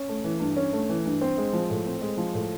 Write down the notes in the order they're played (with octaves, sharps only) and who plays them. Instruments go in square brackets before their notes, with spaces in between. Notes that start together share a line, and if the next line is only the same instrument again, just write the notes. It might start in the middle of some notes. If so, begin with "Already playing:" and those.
Already playing: [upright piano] C#4
A3
E3
G2
C#4
A3
E3
G2
C4
G#3
F3
A2
C4
G#3
F3
A2